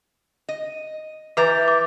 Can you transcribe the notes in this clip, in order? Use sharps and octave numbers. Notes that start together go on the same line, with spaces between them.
D#5
E3 B4 E5 A#5 D6 G6 A6
D6